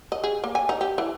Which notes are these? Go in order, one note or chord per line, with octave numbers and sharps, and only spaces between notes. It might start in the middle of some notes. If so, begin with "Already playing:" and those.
D#5
G#4
A#3
G#5
D#4
G4
E3